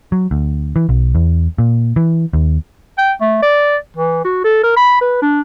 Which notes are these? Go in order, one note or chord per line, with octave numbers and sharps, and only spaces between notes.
F#3
D2
E3
B1
E2
A#2
E3
D#2
G5
A3
D5
E3
F#4
A4
A#4
B5
B4
D4